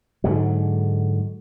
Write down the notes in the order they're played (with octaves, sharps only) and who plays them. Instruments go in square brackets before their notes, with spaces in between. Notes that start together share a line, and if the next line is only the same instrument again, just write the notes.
[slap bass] G#2 D3 F#3